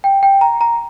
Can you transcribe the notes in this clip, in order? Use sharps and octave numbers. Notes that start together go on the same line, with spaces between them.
G5
G5
A#5
A#5